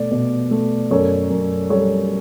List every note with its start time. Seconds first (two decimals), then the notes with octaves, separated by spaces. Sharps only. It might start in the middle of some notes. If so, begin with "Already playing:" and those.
Already playing: B2 A3 D5
0.11 B2
0.51 A3
0.91 F#2 A4 C#5
1.30 F#2
1.70 G3 A4 C#5